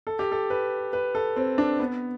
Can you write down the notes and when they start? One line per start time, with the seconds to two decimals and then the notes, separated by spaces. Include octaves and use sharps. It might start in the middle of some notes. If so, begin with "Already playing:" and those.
0.07 A4
0.19 G4
0.32 A4
0.50 B4
0.93 B4
1.15 A4
1.36 C4
1.58 D4
1.79 B3